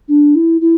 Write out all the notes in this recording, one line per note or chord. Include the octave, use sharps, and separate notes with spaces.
D4
E4
E4